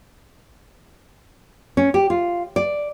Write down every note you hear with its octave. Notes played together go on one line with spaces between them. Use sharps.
C#4
G4
F4
D5